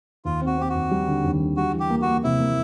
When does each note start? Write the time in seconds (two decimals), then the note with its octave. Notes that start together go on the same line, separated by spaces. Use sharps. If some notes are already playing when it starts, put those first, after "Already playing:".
0.25 D#2 F4
0.42 C4 F#4
0.58 C4 G4
0.69 F#4
0.75 D#2
0.91 G3
1.08 D3
1.24 D#2
1.40 D3
1.57 G3 F#4
1.73 E3
1.80 G4
1.90 A#3
2.02 F#4
2.07 A#3
2.24 C3 E4
2.40 A#3